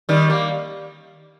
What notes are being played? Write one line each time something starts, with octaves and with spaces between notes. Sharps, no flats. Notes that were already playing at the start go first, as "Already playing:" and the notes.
D#3 G3
G3 A#3